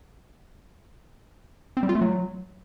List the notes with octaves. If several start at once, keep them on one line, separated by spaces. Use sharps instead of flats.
C4
G3
F4
A3
F#3